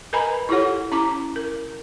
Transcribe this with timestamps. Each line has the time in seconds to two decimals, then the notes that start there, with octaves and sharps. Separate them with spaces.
0.13 A#4 B4 D#5 G#5 A#5 B5
0.49 E4 F4 G4 A4 C#5 F#5
0.92 C#4 E4 A5 A#5 D6
1.36 A#4